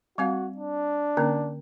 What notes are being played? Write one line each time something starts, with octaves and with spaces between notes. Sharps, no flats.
G3 C4 F#4 F5
D4
D3 A#3 C#4